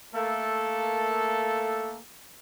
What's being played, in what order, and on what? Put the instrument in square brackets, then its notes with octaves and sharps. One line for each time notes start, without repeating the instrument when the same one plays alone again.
[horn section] A3 A#3 A4